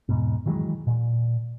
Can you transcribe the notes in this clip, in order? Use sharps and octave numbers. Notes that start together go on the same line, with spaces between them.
E2 G#2 B2
D#3 E3 F#3 G#3
A#2